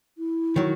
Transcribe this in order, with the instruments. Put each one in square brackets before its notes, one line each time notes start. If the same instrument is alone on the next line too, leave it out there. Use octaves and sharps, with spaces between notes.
[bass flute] E4
[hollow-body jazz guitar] D#3 F#3